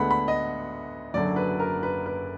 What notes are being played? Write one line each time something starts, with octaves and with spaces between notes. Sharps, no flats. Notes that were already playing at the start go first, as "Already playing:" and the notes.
Already playing: D2 D3 G#3 B3 F#5 B5
B5
D#5
F#1 F#2 D3 F#3 D5
B4
A#4
B4
B4